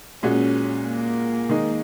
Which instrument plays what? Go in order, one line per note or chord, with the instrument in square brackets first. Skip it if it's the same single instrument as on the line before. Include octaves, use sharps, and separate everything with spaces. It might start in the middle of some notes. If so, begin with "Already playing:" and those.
[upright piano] A#2 G#3 F#4 [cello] C#4
[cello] A#3
[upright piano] D#3 G#3 D#4